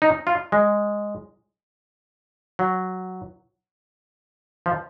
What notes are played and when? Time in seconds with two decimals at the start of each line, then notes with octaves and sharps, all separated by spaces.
0.02 D#4
0.27 F4
0.52 G#3
2.59 F#3
4.66 F3